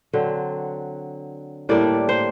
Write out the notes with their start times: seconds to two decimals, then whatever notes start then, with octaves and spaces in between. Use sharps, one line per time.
0.13 D3 F#3 C4
1.69 A2 G3 A#3 D4 D5
2.09 C5